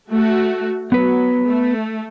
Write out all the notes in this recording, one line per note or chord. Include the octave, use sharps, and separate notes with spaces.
A3 F#4
F#3 B3 B4
A3